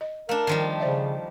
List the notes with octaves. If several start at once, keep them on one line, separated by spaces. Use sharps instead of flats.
D#5
A3 D4 A#4 F5
D#3 F3 G3
C#3 C5 D5 E5